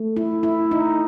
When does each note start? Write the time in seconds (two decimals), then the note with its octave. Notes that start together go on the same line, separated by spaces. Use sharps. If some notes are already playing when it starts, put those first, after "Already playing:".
Already playing: A3
0.17 E4
0.43 E4
0.71 D#4